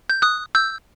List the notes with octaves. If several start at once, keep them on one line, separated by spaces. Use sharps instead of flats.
G6
D#6 F#6
E6 G6